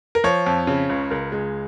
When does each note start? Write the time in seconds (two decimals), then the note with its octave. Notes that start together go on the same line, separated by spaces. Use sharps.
0.15 A#4
0.24 F3 C#5
0.46 F2
0.67 C#3
0.89 C#2
1.10 C#2 A#4
1.32 C#2 G#3